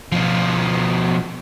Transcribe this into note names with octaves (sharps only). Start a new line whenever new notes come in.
B2 F3